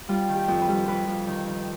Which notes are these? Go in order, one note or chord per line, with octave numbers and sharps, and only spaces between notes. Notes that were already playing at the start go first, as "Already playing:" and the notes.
G3 F4
D#3
G4
F2
B4
G3
F2 B4
F2
D#3
D#3